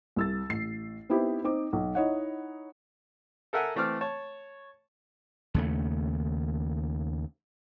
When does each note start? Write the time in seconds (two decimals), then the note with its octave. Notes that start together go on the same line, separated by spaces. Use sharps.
0.16 C2 E6 A6
0.49 A1 C7
1.10 B3 C4 D#4 E4 G4
1.44 C4 D#4 D6
1.73 B1
1.95 D#4 E4 C#5 D#5 F#5
3.53 A4 A#4 E5 F#5 G#5
3.76 E3 A3 C4 D6 F6
4.01 C#5 A5
5.54 D#2 C#3 A3